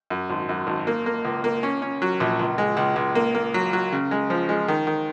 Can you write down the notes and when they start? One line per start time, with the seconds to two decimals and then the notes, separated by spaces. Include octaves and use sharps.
0.10 F#2
0.30 G#1
0.49 F#2
0.67 G#1
0.87 A#3
1.06 A#3
1.25 C#2
1.44 A#3
1.63 C#4
1.82 C#4
2.02 F#3
2.20 A#1
2.39 C#2
2.58 G#3
2.77 C#2
2.96 C#2
3.15 A#3
3.35 A#3
3.54 F#3
3.73 F#3
3.92 C#3
4.11 G#3
4.30 F3
4.49 G#3
4.68 D#3
4.87 D#3